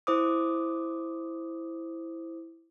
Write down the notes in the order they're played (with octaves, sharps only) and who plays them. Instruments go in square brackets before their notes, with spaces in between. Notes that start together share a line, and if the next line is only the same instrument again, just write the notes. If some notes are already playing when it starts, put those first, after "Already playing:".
[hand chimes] E4 C5 D6 D#6